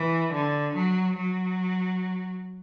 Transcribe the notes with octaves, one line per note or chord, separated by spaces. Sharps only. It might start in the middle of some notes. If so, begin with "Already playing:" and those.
Already playing: E3
D3
F#3
F#3